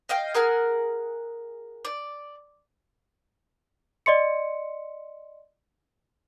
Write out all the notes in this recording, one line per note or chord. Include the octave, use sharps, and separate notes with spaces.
D#5 F5 G5
G#4 A#4 F#5 F6
D5
D5 D#5 C6 C#7